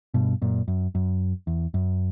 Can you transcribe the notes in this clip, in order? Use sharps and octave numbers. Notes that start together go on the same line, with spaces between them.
G2 B2
F#2 A#2
F#2
F#2
E2
F#2